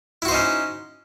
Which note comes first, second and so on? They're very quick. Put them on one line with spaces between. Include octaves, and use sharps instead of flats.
E4 F#4 C5 D#4 C#4